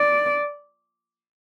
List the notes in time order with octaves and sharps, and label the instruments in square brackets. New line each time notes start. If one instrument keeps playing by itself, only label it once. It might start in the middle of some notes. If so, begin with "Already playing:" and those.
Already playing: [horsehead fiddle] D5